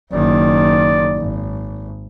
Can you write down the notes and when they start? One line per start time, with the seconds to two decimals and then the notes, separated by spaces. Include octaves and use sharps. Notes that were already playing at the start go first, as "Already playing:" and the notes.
0.13 F#1 D#3 D5
1.16 G#1